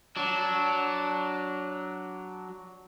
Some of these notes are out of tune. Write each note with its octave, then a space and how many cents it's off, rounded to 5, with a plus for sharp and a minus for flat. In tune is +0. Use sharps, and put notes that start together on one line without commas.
F#3 +5 D4 -10